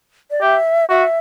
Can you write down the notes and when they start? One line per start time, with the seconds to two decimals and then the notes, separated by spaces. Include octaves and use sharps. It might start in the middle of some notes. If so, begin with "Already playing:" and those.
0.31 D5
0.41 G4 E5
0.89 F#4 E5